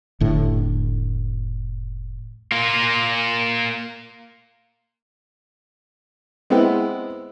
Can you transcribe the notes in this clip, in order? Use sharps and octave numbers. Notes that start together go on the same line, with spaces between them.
F1 A2 D3
A#3 F4
G#3 B3 C4 E4 F#5 G5